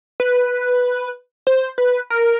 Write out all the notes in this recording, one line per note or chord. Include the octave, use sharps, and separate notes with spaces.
B4
C5
B4
A#4